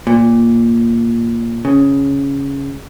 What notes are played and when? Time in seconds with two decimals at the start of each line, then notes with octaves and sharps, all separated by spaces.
0.07 A#2
1.65 C#3